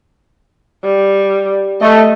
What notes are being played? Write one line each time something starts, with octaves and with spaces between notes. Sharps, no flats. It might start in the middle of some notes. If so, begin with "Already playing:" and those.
G3
A3 D#5